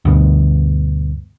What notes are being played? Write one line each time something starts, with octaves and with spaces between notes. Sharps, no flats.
D2 G2 B2